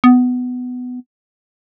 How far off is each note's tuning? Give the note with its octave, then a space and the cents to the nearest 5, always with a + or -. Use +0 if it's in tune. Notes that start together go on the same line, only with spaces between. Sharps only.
B3 +15